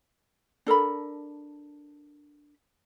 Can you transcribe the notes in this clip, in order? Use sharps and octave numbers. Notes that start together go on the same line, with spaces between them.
D4 A4 A#4 B5